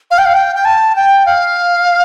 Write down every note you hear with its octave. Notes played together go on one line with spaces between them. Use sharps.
F5
G5
F5
G5
G5
A5
G5
F5